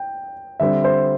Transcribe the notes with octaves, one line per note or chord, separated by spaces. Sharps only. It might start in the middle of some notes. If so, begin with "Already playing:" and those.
Already playing: G5
D3 G3 C4 E5
C5